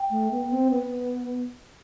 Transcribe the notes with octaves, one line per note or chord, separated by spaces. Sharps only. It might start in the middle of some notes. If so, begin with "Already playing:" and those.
Already playing: G5
A3
B3
C4
B3